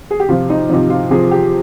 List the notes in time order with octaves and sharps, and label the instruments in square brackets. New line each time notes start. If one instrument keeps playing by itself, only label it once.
[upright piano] G#4
G4
C3 F3 F4
D#4
C3 F3 D#4
F4
C3 F3 G#4
G4